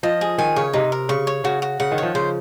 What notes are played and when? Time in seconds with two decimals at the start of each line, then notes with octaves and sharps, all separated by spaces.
0.03 F3 D#5
0.21 G#4
0.38 D#3 G#5
0.56 C#3 C#5
0.73 C3 D#4
0.92 A#4
1.09 C#3 C#6
1.27 C#5
1.44 C#3 F#4
1.62 F#4
1.80 C#3 F#5
1.91 D#3
1.98 F3 C#5
2.15 C#3 C5